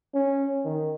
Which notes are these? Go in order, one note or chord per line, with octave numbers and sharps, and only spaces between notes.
C#4
D#3